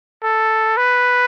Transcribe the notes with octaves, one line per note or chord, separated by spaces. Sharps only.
A4
B4